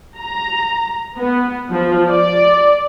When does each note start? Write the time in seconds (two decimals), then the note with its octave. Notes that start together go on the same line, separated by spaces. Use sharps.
0.19 A#5
1.19 B3
1.72 F3
2.09 D5